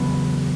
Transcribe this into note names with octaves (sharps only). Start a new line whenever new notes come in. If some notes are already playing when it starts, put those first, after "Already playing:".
Already playing: E2 C#3 F#3 B3